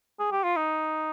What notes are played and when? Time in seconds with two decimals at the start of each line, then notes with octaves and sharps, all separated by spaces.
0.20 G#4
0.32 G4
0.44 F4
0.57 D#4